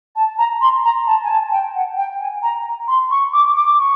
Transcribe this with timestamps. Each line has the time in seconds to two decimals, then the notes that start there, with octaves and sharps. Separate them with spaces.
0.16 A5
0.38 A#5
0.61 C6
0.84 A#5
1.06 A5
1.24 G#5
1.29 A5
1.52 G5
1.75 F#5
1.97 G5
2.20 G#5
2.43 A#5
2.88 C6
3.11 C#6
3.33 D6
3.56 D6
3.79 C#6